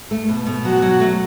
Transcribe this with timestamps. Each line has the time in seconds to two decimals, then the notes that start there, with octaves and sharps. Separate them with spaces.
0.11 A3
0.29 B2
0.47 B2
0.65 F#3 F#4
0.82 F#3
1.00 A3